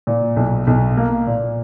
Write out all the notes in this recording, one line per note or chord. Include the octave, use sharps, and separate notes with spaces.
A#2
B1
B1
A#3
A#2